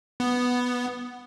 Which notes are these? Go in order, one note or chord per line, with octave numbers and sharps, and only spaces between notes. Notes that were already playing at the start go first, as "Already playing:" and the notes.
B3